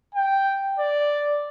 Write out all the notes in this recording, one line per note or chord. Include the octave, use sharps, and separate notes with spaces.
G5
D5